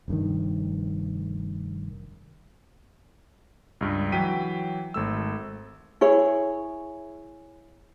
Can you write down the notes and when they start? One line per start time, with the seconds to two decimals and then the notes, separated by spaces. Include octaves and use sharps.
0.08 F1 G2 B2 D#3
3.81 C#2 G2
4.12 E3 F#3 G5 B6 D#7
4.94 G#1 A3 E6
6.01 E4 G#4 C#5